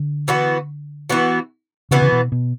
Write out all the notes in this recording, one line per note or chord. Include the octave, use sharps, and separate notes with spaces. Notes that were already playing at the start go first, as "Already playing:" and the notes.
Already playing: D3
E3 B3 F#4
E3 B3 F#4
C#3 E3 B3 F#4
C#3
B2
B2